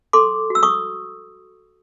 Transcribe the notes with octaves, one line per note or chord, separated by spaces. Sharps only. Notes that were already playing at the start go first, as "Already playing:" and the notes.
A4 C6 D6
F#4 E6
C#6 D#6